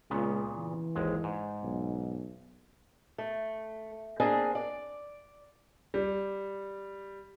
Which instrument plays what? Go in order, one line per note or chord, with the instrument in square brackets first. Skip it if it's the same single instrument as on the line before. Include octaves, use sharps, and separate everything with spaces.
[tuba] C#2 [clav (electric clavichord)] A#2 C#3 B3
[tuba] E3
[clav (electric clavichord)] G#1 D#2 G#3
G#2
[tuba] B1
[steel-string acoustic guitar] A3
A#3 C4 D4 G#4
D5
[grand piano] G3